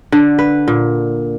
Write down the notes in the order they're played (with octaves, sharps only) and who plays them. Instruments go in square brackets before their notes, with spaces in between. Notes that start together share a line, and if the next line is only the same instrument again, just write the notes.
[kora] D3
B4
A#2